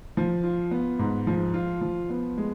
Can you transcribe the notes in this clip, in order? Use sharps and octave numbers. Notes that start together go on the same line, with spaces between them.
F3
F4
B3
G#2
F3
F4
F3
B3
G#3